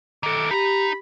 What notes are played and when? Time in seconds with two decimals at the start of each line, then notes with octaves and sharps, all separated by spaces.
0.23 D#3 A4 D6
0.51 D#4 G4 A#5 B5